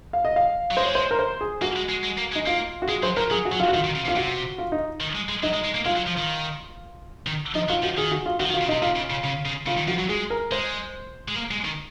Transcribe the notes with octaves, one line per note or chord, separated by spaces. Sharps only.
F5
D#5
F5
F#3
G#3 C5
C#5
C5
A#4
C5
G#4
A#3 F#4
G#3
G#3
G#3
A#3
G#3
D#4
A#3 F4
F#4
G#3 G#4
F#3 C5
F#3 A#4
F#3 G#4
F#4
F#3
F4
F#4
D#3 F4
D#3
C#3
C3
F4
C3 F#4
F4
D#4
D#3
G#3
G#3
F#3 D#4
G#3
G#3
A#3
G#3 F4
F#3
F3
D#3
D#3
F3 D#4
F#3 F4
F3 F#4
D#3 G#4
F#4
F4
D#3 F#4
F3
D#3
F4
C#3
C3 D#4
C3 F4
C#3
C#3
C#3
C#3
C#3 F4
D#3
F3 F#4
F#3
G#3 G#4
A#4
G#3 C5
G#3
A#3
G#3
D#3